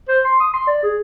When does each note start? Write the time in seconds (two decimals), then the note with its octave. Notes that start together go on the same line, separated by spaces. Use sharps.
0.08 C5
0.25 C6
0.40 D#6
0.54 C6
0.67 D5
0.83 G#4